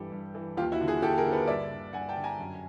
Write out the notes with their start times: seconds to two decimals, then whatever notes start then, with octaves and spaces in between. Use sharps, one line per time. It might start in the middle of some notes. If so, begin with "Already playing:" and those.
Already playing: G2 E3 G4 A4
0.12 G2
0.35 E3
0.57 D#2 F4 G4
0.72 E4 F#4
0.81 D3
0.88 F#4 G#4
1.02 D#2 G4 A4
1.18 G#4 A#4
1.25 D3
1.33 A4 B4
1.48 G2 D5 E5
1.70 D3
1.93 G2 F#5 G#5
2.09 G5 A5
2.16 D3
2.24 G#5 A#5
2.39 F#2